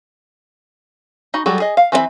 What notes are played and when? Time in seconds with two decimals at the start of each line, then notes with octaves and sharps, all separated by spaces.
1.34 D#4 F#4 B5
1.46 F#3 G3 F#4 G#4 A4
1.60 G#4 D#5
1.77 F5
1.92 E3 C4 F#4 E5 B5